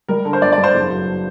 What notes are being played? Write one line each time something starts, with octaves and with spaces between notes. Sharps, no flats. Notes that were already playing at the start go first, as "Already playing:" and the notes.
G3 A#4
D3
C5
G1 D5
D5
G2
C5
F#1
F#3